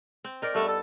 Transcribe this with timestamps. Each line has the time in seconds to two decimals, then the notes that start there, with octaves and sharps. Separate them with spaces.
0.24 C4
0.42 D#4 A#4 D5
0.55 G2 A3 B3
0.68 A4